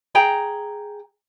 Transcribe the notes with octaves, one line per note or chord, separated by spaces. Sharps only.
G#4 G5 A#5